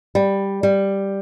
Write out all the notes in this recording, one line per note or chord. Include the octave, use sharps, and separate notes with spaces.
G3
G3